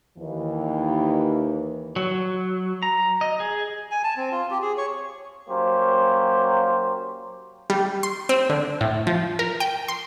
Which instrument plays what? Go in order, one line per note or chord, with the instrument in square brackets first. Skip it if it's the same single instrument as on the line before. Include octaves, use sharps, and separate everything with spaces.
[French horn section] D#2 E3
[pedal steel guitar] F#3
A#5
D#5
G#4
[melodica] G#5
A5
C4
F4
G4
G#4
C#5
[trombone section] F#3 A#3 C#4 G4 C5
[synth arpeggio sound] G3
C6
C4
D3
A2
F3
A#4
G5
C6